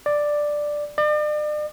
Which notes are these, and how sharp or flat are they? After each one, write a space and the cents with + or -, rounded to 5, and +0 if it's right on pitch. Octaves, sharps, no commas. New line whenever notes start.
D5 +5
D5 +40